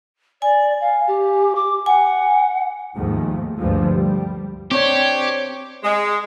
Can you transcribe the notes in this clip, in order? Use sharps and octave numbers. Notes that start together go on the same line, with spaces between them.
D5 G#5
F5
G4
D6
F#5 G#5
D#2 G#2 F3 G#3 A3
D2 G2 D3 F3 G#3
G3
C4 D4 G4 C5 C#5
G#3